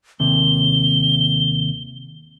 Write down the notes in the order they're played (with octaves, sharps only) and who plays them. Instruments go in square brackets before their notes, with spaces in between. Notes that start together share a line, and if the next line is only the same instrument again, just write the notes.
[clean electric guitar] D#2 C3 [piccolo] G7